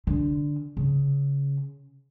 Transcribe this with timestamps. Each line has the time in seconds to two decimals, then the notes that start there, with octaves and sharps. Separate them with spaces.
0.07 D3
0.77 C#3